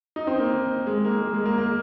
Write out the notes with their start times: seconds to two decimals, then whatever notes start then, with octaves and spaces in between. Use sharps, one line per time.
0.16 D#4
0.27 C4
0.39 A#3
0.87 G#3
1.05 A#3
1.23 G#3
1.34 G#3
1.45 A#3
1.58 A#3